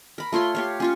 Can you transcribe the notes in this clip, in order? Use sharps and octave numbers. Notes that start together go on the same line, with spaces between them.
A#4 B5
A3 F4 C#5 C6
G4 C#5 F5
C#4 F4 C#6